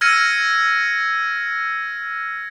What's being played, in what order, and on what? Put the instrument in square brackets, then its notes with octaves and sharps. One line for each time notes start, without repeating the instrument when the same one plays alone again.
[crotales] E6 F6 G#6 A#6 C#7 D#7